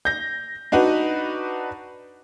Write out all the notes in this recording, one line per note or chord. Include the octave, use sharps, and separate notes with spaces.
G6 A#6
D4 D#4 F#4 B4